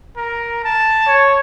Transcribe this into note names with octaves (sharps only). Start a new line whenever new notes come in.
A#4
A5
C#5